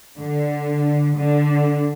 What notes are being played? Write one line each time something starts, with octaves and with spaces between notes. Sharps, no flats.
D3
D3